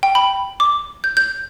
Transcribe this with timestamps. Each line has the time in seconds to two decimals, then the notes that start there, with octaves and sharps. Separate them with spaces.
0.03 G5
0.15 B5
0.60 D6
1.04 G6
1.17 G6